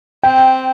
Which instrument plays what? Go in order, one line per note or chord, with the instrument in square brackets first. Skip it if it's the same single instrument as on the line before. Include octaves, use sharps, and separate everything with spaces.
[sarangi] C4 [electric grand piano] G5